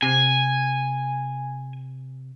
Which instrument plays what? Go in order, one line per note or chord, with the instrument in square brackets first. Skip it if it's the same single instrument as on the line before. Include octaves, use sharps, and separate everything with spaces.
[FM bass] C3 [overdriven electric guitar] G#5